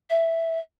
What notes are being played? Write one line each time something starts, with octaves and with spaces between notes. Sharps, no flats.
E5